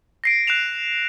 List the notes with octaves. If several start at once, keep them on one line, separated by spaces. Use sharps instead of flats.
A#6 C7 D7
F#6 C7 E7 F7